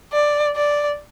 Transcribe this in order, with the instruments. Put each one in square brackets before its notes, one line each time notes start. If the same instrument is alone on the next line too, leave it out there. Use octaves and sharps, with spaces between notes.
[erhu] D5
D5